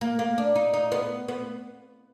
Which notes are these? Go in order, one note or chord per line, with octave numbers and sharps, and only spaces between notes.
A#3
A#3
D4
D#4
D#4
B3
B3